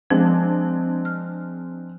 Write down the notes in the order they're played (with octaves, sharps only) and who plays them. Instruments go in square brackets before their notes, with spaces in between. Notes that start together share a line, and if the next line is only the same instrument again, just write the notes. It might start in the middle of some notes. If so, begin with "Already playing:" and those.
[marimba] F3 [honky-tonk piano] G#3 C4 D4
[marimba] F6